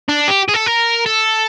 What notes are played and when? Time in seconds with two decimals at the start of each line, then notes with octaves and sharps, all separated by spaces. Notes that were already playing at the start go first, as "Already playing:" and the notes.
0.09 D4
0.28 G4
0.49 G#4
0.54 A4
0.66 A#4
1.06 A4